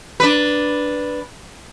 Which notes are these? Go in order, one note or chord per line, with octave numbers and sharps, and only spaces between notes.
D4 B4